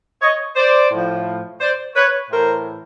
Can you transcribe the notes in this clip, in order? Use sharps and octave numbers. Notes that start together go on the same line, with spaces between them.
C#5 D#5
C5 D5
A2 F3
C5 D5
B4 C#5
A2 E3 A#4 C5